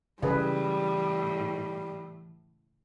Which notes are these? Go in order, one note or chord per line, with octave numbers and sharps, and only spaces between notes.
A2 C#3 E3 G3 G#4 B4